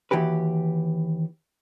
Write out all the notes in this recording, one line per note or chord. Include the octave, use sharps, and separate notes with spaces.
D#2 E3 F#4 G4 B4